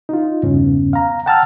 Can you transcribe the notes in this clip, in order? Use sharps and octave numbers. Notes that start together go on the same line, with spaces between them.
D#4 F4
E2 G2 C#3 B3 C#4
F5 A#5
F#5 G5 A5 A#5 E6 F6